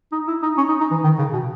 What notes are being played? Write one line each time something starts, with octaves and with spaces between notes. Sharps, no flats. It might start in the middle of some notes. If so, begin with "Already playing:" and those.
D#4
E4
D#4
C#4
D#4
D#4
E3
D#3
C#3
B2